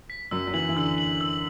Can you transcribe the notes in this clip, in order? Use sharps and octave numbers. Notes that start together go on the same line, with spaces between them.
B6
F#2 F#3 E6
F#3
E3 F#7
E3
D3 E6
F#7
E6